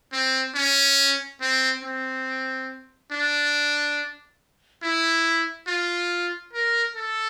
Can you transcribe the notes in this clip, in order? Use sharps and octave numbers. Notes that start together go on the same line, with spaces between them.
C4
C#4
C4
C4
D4
E4
F4
A#4
A4